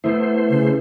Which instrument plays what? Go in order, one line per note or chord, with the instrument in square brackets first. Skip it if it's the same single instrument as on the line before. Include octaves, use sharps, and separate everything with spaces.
[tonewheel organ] A3 C5 [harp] B3 E4
[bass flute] C#3